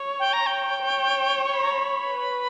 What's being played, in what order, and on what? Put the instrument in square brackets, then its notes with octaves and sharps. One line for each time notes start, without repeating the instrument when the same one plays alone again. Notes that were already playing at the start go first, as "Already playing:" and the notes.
Already playing: [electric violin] C#5
[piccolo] G5
A#5
G5
[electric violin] C#5
[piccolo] C#6
B5
A#5
B5
[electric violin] B4